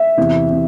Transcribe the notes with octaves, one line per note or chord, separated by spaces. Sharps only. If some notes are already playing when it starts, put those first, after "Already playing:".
Already playing: E5
E2 C3 E3
C3